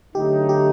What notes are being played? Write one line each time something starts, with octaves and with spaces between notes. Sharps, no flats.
D3 F#3 A3 D#4 G4
G4